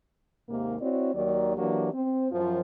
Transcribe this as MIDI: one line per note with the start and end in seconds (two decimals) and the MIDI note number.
0.49 0.75 39
0.49 0.75 44
0.49 0.75 48
0.49 0.75 58
0.80 1.11 60
0.80 1.11 64
0.80 1.11 66
0.80 1.11 73
0.80 1.11 74
1.14 1.55 39
1.14 1.55 51
1.14 1.55 54
1.14 1.55 74
1.58 1.90 52
1.58 1.90 54
1.58 1.90 58
1.58 1.90 62
1.58 1.90 67
1.92 2.26 60
2.31 2.60 42
2.31 2.60 53